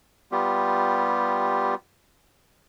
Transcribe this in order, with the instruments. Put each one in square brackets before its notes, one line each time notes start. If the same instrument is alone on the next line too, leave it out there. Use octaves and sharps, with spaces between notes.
[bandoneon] G3 B3 F4 G4